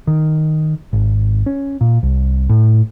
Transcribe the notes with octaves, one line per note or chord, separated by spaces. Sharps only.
D#3
G#1
C#4
A#2
C2
A2